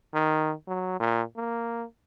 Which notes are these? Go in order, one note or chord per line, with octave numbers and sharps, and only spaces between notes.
D#3
F#3
A#2
A#3